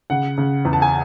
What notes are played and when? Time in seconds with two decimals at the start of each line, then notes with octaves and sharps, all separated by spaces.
0.10 C#3 F#5
0.38 C#3
0.65 E2
0.73 A5
0.82 G#5